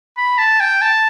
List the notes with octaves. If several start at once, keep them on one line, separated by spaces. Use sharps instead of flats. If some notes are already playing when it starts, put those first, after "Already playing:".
B5
A5
G5
A5